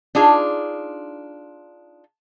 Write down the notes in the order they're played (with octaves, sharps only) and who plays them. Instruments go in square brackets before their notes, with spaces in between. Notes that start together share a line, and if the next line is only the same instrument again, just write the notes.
[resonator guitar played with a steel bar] D4 D#4 F4 G#4